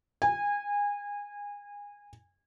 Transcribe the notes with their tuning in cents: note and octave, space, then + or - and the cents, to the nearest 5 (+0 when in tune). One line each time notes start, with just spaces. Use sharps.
G#5 -25